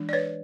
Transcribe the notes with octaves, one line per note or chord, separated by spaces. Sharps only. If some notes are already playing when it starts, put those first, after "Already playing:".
Already playing: E3 G#3 D4
D5
B4 C#5